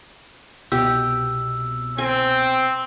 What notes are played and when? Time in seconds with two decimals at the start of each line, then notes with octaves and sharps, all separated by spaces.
0.72 C2 B2 G4 E6
1.98 C4 G#5